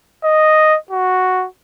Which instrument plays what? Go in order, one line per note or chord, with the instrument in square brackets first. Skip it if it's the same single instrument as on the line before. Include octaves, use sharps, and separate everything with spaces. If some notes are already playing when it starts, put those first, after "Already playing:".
[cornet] D#5
F#4